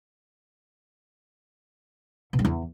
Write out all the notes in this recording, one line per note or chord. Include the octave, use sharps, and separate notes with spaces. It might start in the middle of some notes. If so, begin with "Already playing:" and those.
B2
G3
E2